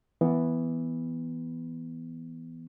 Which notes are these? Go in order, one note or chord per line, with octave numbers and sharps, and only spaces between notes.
E3 B3